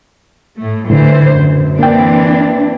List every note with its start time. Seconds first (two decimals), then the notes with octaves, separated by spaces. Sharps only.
0.58 A2 A3
0.90 A2 D3 E3 C5
1.35 F#2
1.79 E3 A#3 C4 D4 G5